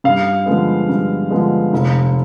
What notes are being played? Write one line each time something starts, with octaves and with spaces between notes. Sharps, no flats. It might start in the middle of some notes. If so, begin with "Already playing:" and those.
G2 F5
D3 F3 G#3 B3
G2
D3 F3 G#3 B3
F1